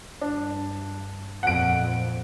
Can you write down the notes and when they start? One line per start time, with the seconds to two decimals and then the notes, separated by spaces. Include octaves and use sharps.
0.21 G2 D4
1.43 F2 A#2 F#5 D7